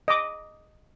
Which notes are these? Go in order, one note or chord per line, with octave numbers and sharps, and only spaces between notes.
D#5 D6